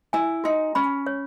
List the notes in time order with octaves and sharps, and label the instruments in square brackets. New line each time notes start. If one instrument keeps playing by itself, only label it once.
[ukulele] E4 [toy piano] G#5
[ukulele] D#4 [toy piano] F#4
[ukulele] C#4 [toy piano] B5
[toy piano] C#5